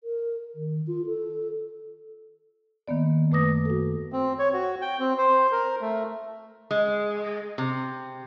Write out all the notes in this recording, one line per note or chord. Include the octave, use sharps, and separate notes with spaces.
A#4
D#3
F4
A4
D#3 A#3 B3 D5
F#2 A3 B4 D6 D#6 A#6
F#4 A4
C4
C#5
F#4
G5
C4
C5
A#4
A3
G#3
C3